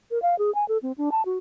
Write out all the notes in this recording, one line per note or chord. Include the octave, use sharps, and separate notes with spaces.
A#4
F5
G#4
G#5
A4
C4
D4
A5
F#4